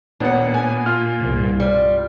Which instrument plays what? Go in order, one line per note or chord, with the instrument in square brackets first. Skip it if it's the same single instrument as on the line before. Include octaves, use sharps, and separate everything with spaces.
[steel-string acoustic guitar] D#2 F#5 [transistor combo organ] A#2 [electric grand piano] B3 D4
[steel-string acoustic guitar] G#5
[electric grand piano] F4 F6
[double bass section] C2 G2
[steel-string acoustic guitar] G3